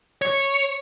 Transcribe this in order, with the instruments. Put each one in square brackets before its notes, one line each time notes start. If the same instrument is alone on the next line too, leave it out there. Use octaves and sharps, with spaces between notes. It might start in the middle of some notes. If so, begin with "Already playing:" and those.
[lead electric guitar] C#5